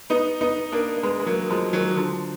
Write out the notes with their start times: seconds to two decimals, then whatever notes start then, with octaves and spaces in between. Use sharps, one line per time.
0.10 B3 D#4
0.41 B3 D#4
0.72 A#3 D4
0.97 A#3
1.03 G#3 B3
1.20 G#3
1.26 F#3 A#3
1.50 F3 G#3
1.73 D#3 F#3
1.96 D3 F3